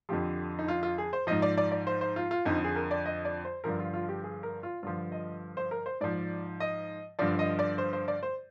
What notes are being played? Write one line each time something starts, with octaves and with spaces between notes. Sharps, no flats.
F2 D3 F3 G4
D#4
F4
F4
G#4
C5
G#2 F3 D#5
D5
D5
D5
C5
C5
F4
F4
F2 D3 F3 D#4
G#4
A#4
D5
D#5
D5
C5
G2 D3 F3 A#4
F4
F4
G4
G#4
A#4
F4
G2 D3 F3 F4
D#5
C5
A#4
C5
G#2 F3 D5
D#5
G2 D3 F3 D5
D#5
D5
C5
C5
D5
C5